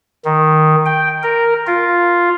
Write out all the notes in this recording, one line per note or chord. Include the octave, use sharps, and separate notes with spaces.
D#3
G5
A#4
F4